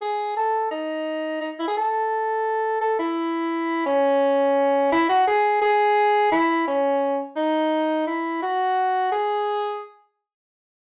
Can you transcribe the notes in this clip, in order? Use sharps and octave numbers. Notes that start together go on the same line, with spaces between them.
G#4
A4
D#4
D#4
E4
G#4
A4
A4
E4
C#4
E4
F#4
G#4
G#4
E4
C#4
D#4
E4
F#4
G#4